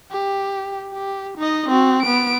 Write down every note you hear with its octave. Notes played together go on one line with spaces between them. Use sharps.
G4
G4
D#4 D#5
C4 F#4
B3 D7